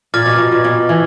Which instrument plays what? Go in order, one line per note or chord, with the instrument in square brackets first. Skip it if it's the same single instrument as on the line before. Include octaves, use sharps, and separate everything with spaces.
[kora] A#2 [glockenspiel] D6 F6 A6
[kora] B2
B2
A#2
B2
E3